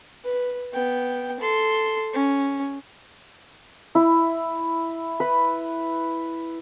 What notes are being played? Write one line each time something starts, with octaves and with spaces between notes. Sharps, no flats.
B4
B3 G5
A4 C6
C#4
E4
B4